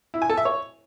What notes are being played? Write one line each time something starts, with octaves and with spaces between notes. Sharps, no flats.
E4
G#5
A4
E5
C#5